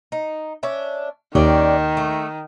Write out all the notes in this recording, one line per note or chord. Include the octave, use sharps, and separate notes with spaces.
D#4
C#4 D4 E5
D#2 D#3 C#4 D4 G5
A3